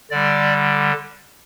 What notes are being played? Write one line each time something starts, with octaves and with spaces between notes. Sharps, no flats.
D3 G3 D5